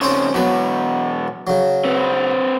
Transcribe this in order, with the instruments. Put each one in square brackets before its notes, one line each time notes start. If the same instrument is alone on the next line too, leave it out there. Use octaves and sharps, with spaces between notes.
[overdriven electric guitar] F2 C#3 [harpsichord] C4 C#4 C5
[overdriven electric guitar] E2 B2 [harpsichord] F#3 B4
[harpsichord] C#3 F#3
[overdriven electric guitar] C4 B4